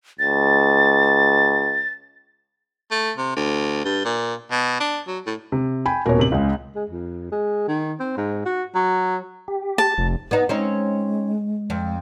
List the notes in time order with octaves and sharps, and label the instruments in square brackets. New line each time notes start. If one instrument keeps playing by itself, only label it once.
[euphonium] C#2 [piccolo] A6
[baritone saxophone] A3
C3
D2
G2
A#2
B2
D4
F#3
A2
[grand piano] C3
[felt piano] G5 G#5 B5
[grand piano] D#1 B2 [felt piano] A#4 C#5
[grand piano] A1 C3 F#7
[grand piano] C#2 [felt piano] C#3 G#3
[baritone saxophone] G#3
F2
G#3
D#3
C4
G#2
F#4
F#3
[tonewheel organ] G4
[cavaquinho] A5
[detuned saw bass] F1
[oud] B3 D#4
[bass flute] G#3 [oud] C4 C#4 D#4
[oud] F2